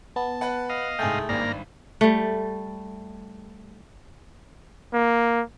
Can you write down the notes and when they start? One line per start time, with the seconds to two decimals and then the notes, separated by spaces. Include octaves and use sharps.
0.16 B3 A5
0.41 B4 F#5
0.69 D#5 F5
0.99 C2 G#2 A3 G#4 G5
1.29 G#1 G2 A#3 D5 A#5
2.01 G3 A3
4.94 A#3